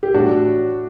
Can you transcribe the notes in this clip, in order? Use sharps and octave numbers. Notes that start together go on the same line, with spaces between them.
G4
A2 D4 F#4